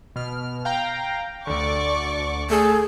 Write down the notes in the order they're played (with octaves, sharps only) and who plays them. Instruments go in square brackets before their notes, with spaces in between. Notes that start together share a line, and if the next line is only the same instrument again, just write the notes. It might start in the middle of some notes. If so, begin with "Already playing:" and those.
[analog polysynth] B2 F6
F5 G5 A#5
[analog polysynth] D2 D3 [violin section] D5 C#6 D6
[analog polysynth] A3 A4 [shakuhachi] G#4